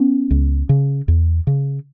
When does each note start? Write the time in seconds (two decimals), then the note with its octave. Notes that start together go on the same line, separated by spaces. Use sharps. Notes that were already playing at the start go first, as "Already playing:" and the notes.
Already playing: B3 C#4
0.31 C#2
0.69 C#3
1.08 E2
1.47 C#3